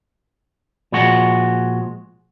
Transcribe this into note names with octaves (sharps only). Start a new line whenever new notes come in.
A#2 F3 G#3 F#4